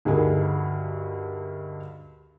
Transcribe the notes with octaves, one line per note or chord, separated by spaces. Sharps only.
D2 G2 D#4 G#4 A#4